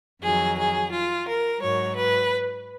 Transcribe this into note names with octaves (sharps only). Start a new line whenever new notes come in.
F2 D#3 F#3 G#4
G#4
F4
A#4
G#2 F#3 C#5
B4